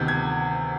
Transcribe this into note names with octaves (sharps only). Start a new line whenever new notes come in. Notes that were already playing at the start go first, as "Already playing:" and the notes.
Already playing: D2 C3 D#3 B3 G6
G#6